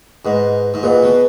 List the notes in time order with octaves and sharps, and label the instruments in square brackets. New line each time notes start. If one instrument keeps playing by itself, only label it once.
[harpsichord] G#2 [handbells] G#4 B4 D#5 F#5
[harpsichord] G#2
[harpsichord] A#2 [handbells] G#4 B4 D#5 F#5
[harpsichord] B2